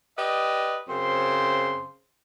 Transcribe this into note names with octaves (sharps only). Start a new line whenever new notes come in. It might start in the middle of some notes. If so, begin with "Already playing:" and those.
G4 B4 D5 D#5
F#2 C#3 C4 C5 C6